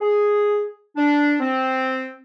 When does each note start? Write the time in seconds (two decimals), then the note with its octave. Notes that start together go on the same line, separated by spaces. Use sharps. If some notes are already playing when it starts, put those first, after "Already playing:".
0.01 G#4
0.97 D4
1.40 C4